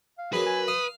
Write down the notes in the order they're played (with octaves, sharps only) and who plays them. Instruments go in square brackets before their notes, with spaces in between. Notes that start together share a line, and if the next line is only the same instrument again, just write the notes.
[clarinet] F5
[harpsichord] F#2 F#3 A#3 [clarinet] G#4 [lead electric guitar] B4
[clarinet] G#5
[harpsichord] F5 [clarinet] D#6